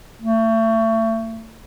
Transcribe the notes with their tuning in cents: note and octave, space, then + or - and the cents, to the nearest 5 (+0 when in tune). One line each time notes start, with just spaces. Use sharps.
A3 +30